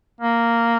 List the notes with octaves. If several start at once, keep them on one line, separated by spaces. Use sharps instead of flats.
A#3